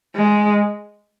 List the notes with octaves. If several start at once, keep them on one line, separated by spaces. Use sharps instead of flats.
G#3